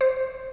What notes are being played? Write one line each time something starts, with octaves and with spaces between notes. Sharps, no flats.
C5